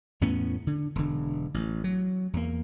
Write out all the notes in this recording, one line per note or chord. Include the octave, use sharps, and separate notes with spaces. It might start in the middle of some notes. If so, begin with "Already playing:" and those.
E2 A2 B3 C#4
D3
E1 D3
A1
F#3
E2 A#3